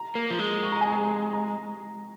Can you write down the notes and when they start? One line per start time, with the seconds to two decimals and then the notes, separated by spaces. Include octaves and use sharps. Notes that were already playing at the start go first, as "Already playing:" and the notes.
Already playing: A#5
0.15 A#3
0.30 F3
0.39 G#3
0.63 C#6
0.72 A#5
0.81 G#5
0.90 A#5
1.33 A#5